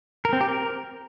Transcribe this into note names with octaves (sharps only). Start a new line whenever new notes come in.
A#4
C4
G4
A#4